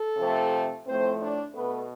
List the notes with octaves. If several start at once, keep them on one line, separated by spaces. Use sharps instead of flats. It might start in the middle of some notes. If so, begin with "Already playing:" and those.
Already playing: A4
C3 F3 A3
A2 F3 A3 C4 C5
D4 D5
B2 A3 B3 B4